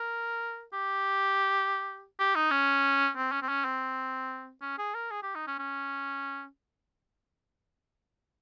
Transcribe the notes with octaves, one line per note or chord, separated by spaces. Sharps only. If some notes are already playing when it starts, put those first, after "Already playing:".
Already playing: A#4
G4
G4
D#4
C#4
C4
C#4
C4
C#4
C4
C#4
G#4
A#4
G#4
G4
D#4
C#4
C#4